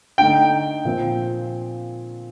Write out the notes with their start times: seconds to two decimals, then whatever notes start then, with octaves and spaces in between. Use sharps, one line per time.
0.18 D3 A3 D#4 G5
0.85 A#2 F3 C4